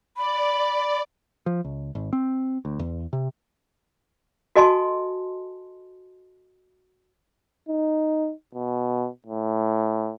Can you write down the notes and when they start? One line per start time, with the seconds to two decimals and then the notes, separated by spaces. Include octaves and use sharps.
0.17 D5 B5
1.46 F3
1.65 C#2
1.95 G#1
2.13 C4
2.65 D2
2.79 E2
3.13 C3
4.56 F#4 A4 D#5 G#5 A5 C6
7.69 D#4
8.55 B2
9.26 A2